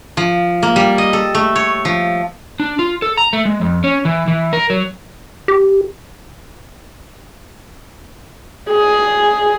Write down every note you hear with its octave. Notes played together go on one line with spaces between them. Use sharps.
F3
A#3
G3
D#5
A4
A3
C#5
F3
D4
F4
A4
A#5
A3
G#3
F2
C#4
E3
E3
A#4
F#3
G4
G#4